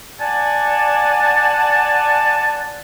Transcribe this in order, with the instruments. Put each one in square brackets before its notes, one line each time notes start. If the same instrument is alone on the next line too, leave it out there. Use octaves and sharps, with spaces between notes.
[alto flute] D5 [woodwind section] F#5 G#5 A5